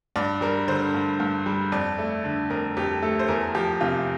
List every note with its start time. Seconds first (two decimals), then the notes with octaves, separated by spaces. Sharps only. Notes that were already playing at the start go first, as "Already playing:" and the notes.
0.16 G2 D5
0.41 G3 A#4
0.68 D3 C5
0.94 G2
1.20 G2
1.46 G3
1.72 F2 D5
1.99 A3
2.24 D3
2.50 F2 A#4
2.77 F2 G4
3.02 A3 A4
3.20 C5
3.28 E2 A#4
3.55 F3 G4
3.81 C3 F4